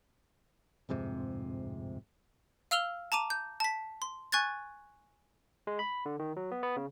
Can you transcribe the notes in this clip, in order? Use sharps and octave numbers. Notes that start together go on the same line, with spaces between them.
D1 F2 G#2 C3
F5 E6 F6 F7 G7
A5 A#5 D6 D#7
G6
A5 B6
C6
G#5 C#6 F#6 G#6 A6
G#3
B5
D3
D#3
F#3
B3
B3
C#3